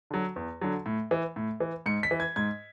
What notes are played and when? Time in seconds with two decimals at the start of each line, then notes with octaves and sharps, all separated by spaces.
0.11 D3 F#3
0.36 E2
0.61 D3 F#3
0.86 A2
1.11 E3
1.36 A2
1.60 E3
1.86 G#2 C#7
2.03 B6
2.11 E3
2.20 G#6
2.36 G#2 G#6